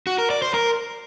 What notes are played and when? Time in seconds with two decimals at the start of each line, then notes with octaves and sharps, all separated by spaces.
0.07 F#4
0.19 A#4
0.30 D5
0.42 C5
0.54 A#4